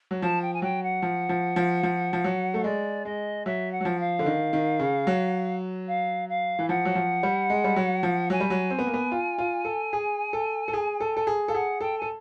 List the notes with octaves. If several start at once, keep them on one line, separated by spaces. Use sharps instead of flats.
F#3
F3 A5
G5
G#5
F#3 G5
F#5
F3
F3
F3
F3
F3
F#3
A3
G#3 D5
G#3 D#5
F#3 E5
F#5
F#3
F3
F5
D3
D#3
D#3
C#3
F#3
F5
F5
E3
F3 F#5
F#3
F3
G3
G#3
G3
F#3
F3
F#3 G#5
G3
F#3
C4
B3
A#3
B3
F4
F4
A4
G#4
A4
A4
G#4
A4
A4
G#4
A4 F5
G#4 F#5
A4 G5
A4 G#5